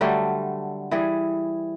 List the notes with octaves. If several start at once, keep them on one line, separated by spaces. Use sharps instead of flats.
D3 F#3 G3 A3
E3 G3 G#4